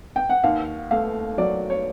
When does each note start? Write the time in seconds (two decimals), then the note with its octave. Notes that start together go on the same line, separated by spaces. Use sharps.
0.16 G5
0.29 F#5
0.44 D#2 F5
0.91 A3 F5
1.38 F#3 D5
1.70 C#5